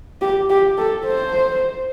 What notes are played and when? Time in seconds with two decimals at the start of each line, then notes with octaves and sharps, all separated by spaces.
0.21 G4
0.50 G4
0.78 A4
1.06 C5